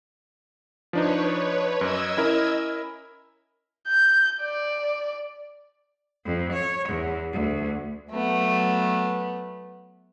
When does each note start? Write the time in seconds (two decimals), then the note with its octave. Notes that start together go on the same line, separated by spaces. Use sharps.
0.93 F3 D4 D#4 B4 C#5
1.81 F#2 D#5 E6 G#6
2.17 C#4 E4 A#4
3.88 G6
4.42 D5
6.23 F2
6.51 C#5
6.88 E2
7.32 D2
8.11 F#3 A3 B3